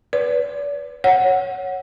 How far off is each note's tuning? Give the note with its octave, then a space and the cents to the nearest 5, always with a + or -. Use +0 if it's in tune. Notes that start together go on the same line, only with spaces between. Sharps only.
B4 +0 D5 -35
C#5 +0 F#5 +0